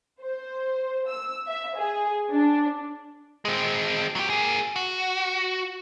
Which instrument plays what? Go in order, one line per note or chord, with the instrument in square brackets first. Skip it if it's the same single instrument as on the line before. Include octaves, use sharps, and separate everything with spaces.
[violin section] C5
E6
E5
G#4
D4
[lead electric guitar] G#3 C4
F#3 G4
A#3 G#4
F#4